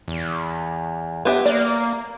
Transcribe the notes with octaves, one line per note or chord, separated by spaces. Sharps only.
E2
B3 G4 E5
A#3 D5